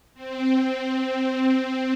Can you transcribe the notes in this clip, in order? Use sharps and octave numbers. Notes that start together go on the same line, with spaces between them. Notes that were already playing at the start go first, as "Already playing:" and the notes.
C4